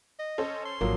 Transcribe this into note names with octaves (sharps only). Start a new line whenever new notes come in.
D#5
C#4 A4 C5
C6
G#1 F3 F#3 A#3